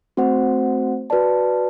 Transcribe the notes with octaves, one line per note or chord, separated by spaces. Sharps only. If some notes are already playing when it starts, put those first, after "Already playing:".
A3 C4 F#4 C5 F#5
F#4 B4 D5 A5